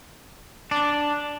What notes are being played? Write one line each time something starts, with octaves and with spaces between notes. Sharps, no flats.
D4